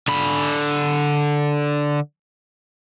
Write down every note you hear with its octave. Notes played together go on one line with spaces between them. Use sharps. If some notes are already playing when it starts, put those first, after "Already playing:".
D3 B5